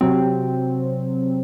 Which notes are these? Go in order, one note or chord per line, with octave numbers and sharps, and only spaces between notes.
C3 F#3 C4